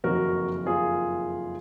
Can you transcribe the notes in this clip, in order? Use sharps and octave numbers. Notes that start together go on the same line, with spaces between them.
F#1 F2 D#3 F#4 A#4
F4 G#4